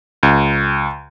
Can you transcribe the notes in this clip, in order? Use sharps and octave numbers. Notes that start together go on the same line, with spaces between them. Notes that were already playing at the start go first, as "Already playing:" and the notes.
C#2